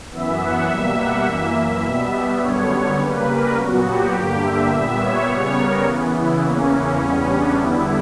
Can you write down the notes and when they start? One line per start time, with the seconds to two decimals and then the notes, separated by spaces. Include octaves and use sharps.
0.11 F#2 E3 B3 E5
0.40 F#5
0.69 B2 G3 A#3 E5
0.97 F#5
1.26 F#2 E3 A#3 E5
1.55 E5
1.84 B2 G3 B3
2.40 F#2 D3 G3 B3 C#5
2.69 C#5
2.98 C#3 G3 A#3 B4
3.27 A#4
3.55 A#2 F#3 B3 F#4
3.84 G4
4.12 G2 D3 A#3
4.41 E5
4.70 A#2 G3 B3 E5
4.99 C#5
5.28 C#3 G3 B3
5.56 A#4
5.85 C#3 E3 B3
6.13 E4
6.42 E2 C#3 E3 A#3 C#4
6.70 C#4
6.99 E2 C#3 G3 B3 C#4
7.28 D4
7.56 E2 D3 G3 B3 E4